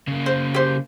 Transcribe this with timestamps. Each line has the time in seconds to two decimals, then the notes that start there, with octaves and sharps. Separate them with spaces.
0.08 C#3 A#3
0.26 C5
0.54 G4 C5